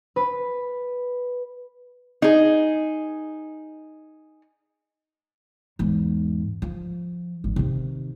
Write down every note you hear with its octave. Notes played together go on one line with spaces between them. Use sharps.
B4
D#4 G#4
E2 G#2
F3
G#1
C3 D#3